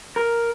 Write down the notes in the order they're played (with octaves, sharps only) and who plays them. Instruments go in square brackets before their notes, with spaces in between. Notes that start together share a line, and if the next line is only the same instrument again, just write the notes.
[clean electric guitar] A#4